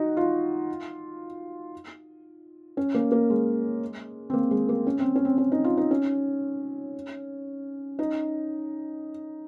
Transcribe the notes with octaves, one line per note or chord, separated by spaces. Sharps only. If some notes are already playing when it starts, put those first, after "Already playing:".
Already playing: D#4 F#4
F4
C#4
A#3
A#3
G#3
C4
A#3
G#3
A#3
C#4
C4
C#4
C4
C#4
D#4
F4
D#4
C#4
D#4